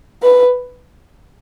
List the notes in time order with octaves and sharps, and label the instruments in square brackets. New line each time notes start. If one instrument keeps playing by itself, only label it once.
[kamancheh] B4